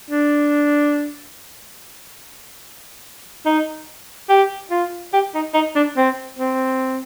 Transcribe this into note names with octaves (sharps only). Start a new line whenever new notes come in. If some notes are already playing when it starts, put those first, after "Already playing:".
D4
D#4
G4
F4
G4
D#4
D#4
D4
C4
C4